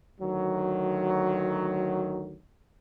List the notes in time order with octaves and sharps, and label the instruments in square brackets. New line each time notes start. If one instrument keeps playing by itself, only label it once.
[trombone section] D2 D#3 F#3